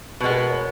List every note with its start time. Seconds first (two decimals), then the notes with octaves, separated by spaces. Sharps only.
0.21 B2 G#3 B3 B4
0.30 A#4
0.51 C#5